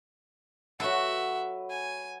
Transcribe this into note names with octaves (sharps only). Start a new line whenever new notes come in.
F#3 F#4 A4 B4 E5 F#5
G#5